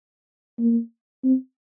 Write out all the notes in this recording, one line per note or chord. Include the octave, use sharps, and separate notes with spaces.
A#3
C4